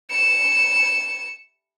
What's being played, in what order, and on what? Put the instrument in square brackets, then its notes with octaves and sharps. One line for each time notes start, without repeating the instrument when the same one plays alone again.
[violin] C#7 E7